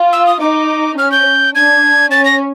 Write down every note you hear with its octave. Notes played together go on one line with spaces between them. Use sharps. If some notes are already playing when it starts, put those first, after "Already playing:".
Already playing: F4
E6
D#6
D#4 D6
C#4 F6
G6
D4 G#6
C#4 A6
A#6